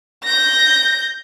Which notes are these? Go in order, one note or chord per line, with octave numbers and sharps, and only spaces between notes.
G6 A#6